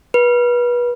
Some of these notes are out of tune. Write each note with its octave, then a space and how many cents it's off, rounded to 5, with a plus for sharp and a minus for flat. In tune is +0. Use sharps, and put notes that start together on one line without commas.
B4 -30